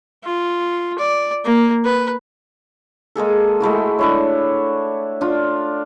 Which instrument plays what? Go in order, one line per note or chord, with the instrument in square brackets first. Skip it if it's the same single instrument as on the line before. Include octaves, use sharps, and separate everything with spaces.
[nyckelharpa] F4
D5
A#3
B4
[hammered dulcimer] G#3 A#3 G#4 A4
G#3 A3 E4 F#4
D4 E4 C#5
D4 F4